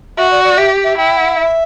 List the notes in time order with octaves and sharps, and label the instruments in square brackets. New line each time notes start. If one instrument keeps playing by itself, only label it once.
[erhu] F#4 [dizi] E5
[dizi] D5
D5
[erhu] G4 [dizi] E5
[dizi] E5
[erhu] E4 [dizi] G5
[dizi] F#5
E5